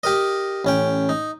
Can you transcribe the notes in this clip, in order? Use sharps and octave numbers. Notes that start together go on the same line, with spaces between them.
G4 A#4 D#5
A1 C#4 G5
D#4